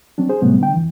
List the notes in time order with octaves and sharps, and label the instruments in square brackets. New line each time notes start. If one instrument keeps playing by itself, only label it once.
[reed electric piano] F#3 C4 D4
G#4 C5
A2 C3 F#3 G3 A3 B3
D3 D4 G5
F2 E3